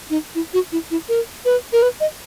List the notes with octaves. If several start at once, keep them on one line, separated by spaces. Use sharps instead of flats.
D#4
E4
F#4
E4
E4
A#4
B4
A#4
B4
D#5